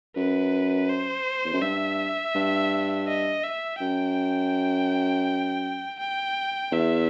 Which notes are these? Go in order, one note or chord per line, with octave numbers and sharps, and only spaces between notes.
F#2 B4
C5
E2
F#2
G2 E5
G2
D#5
E5
F#2 G5
G5
E2 E5